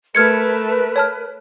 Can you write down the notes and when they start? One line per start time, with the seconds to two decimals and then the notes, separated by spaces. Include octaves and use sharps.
0.15 A3 A#4 B4 F6 G#6 C#7
0.96 C#5 A5 F6